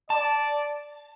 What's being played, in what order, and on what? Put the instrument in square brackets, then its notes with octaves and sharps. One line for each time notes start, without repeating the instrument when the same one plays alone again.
[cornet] D5 [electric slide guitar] A5